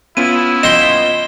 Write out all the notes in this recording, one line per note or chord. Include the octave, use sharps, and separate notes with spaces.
B3 C#4 E4 F4 D#7
D#5 G5 C6 E7